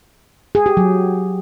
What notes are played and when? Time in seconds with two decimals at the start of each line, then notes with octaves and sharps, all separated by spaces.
0.55 G#4
0.66 G4
0.77 F#3